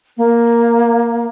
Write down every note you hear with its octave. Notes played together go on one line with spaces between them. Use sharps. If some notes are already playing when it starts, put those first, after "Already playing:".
A#3